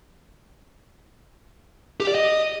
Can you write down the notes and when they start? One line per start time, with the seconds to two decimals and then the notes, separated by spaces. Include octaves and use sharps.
2.00 G4
2.08 D5
2.15 D#5